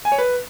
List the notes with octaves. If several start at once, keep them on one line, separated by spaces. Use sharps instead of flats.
G#5
C#5
B4